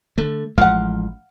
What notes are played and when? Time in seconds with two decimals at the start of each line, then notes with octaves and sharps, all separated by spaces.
0.18 D3 A3
0.58 A1 F3 G#3 F5 F#5